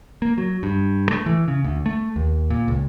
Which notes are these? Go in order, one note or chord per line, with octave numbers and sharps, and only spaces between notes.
A#3
F#3
G2
A3
E3
C#3
D2
A3
D#2
A#2
C#2